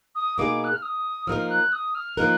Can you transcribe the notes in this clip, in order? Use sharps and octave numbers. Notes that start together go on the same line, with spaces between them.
D#6
B2 A#3 D#4 G#4 D6
F#6
F6
D#6
F3 A#3 D#4 A#4 F6
F#6
D#6
F6
F3 A#3 D#4 A#4 F#6